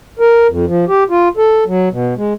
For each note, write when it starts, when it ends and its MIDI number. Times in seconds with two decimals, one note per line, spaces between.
0.19 0.47 70
0.48 0.65 41
0.67 0.85 53
0.88 1.04 67
1.10 1.29 65
1.37 1.64 69
1.66 1.89 54
1.91 2.14 47
2.17 2.33 56